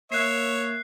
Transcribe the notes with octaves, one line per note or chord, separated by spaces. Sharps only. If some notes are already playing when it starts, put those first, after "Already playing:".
A#3 C#5 E5 F#6 C7